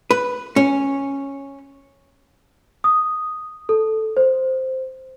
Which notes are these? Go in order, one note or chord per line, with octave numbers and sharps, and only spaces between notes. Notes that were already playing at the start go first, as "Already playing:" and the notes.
B4
C#4
D#6
A4
C5